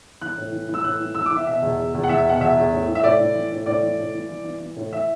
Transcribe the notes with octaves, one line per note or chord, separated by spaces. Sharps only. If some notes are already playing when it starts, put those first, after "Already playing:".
E3 F#6
A2
E3
E3
E6
A2 F#6
E3
E3 E6
D6
E3
E5
B2 E5
E2
E2
E2
F#5
E2 E5
B2 F#5
E2 E5
E2
A2
E3
E5
A2 D5
A2
E3
A2
A2 D5
E3
A2
E3
E3
E3
E3
A2
E3 E5